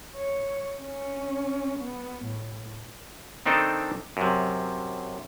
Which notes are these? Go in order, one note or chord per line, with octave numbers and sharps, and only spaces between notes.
C#5
C#4
B3
A2
D#3 C4 D4 D#4 A4 G5
F#2 C3